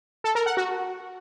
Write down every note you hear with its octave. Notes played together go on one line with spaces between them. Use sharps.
A4
A#4
F#5
F#4